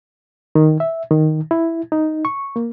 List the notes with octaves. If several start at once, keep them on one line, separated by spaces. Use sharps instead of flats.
D#3
E5
D#3
E4
D#4
C#6
A#3